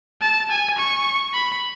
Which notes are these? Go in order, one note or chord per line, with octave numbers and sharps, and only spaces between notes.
A5
G#5
C#6
B5